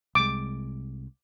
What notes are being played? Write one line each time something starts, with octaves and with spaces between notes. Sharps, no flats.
C2 G#3 D6